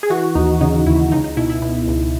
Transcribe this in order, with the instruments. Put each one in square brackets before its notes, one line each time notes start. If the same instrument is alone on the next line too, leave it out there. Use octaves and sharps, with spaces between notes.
[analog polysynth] G#4
E3 F#4
D#2 D#4
C#3 D#4
D#2 E4
C#2 D#4
D#4
B2 E4
E4
B2
C#2